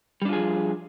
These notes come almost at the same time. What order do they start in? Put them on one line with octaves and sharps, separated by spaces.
G3 D4 F4 G#4 F3